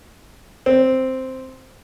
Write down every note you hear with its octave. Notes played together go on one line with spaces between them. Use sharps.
C4